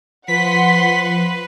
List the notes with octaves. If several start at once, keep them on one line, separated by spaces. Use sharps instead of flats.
F3 B4 F#5 C6 B6